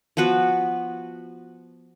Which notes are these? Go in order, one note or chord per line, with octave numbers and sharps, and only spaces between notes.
F3 B3 F#4 B4